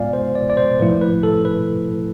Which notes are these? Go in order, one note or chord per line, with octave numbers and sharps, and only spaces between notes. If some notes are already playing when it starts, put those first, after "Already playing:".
Already playing: A2 G#3 B3 F4 D5 F5 G#5
C5
D5
D5
C5
A2 F3 A3 E4 B4
B4
A4
B4